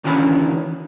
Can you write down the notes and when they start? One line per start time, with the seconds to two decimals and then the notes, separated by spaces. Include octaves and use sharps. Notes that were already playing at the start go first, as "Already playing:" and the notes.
0.04 D2 D#3 E3 C#4 B5